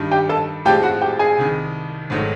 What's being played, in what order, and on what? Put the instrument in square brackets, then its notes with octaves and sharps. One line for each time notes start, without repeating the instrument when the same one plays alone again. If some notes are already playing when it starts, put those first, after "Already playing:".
Already playing: [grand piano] G2 D#3 G3
[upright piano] G4 G5
A4 A5
[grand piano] A2 F3 G#3 C4 F4 [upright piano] G4 G5
[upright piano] F#4 F#5
G4 G5
G#4 G#5
[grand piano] C2 C3 D#3
G#1 G#2 D#3 F#3 A3